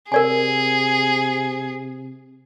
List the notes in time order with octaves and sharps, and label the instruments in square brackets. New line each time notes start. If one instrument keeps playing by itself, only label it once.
[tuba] C3 [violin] G#4 [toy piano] A#4 D5 G#5